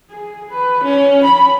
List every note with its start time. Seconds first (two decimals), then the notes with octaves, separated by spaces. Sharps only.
0.11 G#4
0.50 B4
0.83 C#4
1.23 B5